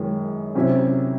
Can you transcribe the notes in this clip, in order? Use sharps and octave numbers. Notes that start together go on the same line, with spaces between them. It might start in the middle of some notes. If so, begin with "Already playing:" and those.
Already playing: F#2 D#3 G#3 E4
C3 F#3 C#4 E4